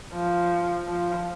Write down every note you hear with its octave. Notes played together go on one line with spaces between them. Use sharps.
F3
F3